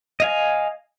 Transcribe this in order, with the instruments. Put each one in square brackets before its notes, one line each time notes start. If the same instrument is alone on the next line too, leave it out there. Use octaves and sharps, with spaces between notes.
[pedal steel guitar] D#5 F5 G#5